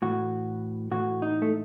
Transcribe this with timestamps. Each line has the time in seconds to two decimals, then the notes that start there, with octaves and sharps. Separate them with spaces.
0.02 A2 E3 F#4
0.91 A2 E3 F#4
1.22 D#4
1.42 A3